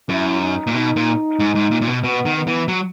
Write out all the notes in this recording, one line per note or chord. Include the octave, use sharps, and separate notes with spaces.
F#2 E4
D#4
A#2
B2 D#4
A#2
G#2
G#2
A#2
A#2
B2
B2 B3
D#3
B3
E3
F#3